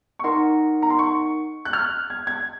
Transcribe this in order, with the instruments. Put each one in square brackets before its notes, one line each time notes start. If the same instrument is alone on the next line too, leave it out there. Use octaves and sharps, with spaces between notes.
[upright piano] C#6
[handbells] D#4 A#4 D#5 F#5 [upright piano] C6
[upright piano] A#5
C6
C#6
F#6
F6
G#6
G#6